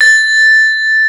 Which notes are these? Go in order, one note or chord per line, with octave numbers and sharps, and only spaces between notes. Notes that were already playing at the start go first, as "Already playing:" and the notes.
A6